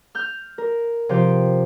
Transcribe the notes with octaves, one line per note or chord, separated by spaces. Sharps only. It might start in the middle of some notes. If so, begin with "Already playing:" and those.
F6 G6
A#4
C3 F3 G4